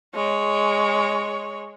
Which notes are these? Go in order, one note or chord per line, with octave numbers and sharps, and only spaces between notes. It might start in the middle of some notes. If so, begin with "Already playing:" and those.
G#3 C#5